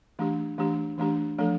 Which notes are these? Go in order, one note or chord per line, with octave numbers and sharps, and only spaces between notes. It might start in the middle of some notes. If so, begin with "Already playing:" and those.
E3 A3 D4 G4
E3 A3 D4 G4
E3 A3 D4 G4
F3 A3 D4 A4